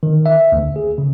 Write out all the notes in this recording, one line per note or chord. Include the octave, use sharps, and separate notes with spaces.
D#3
E5
D2
G#4
C#3